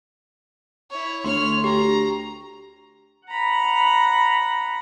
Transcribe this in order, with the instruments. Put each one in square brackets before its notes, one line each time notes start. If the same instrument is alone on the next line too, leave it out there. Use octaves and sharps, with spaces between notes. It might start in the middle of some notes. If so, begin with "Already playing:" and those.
[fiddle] E4 C#5
[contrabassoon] D2 [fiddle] C#5 F6 [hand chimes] C6
[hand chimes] G4 [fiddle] A#5
[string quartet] F#5 A#5 B5